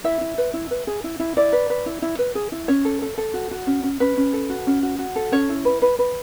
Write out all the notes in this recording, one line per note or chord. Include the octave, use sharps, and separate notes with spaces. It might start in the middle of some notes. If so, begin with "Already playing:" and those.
E4 E5
E4
B4
E4
B4
G#4
E4
E4
E4 D5
B4
B4
E4
E4
B4
G#4
E4
C#4 C#5
A4
A4
A4
F#4
F#4
C#4
C#4
C#4 B4
C#4
A4
F#4
C#4
F#4
F#4
A4
C#4 C#5
E4
B4
B4
B4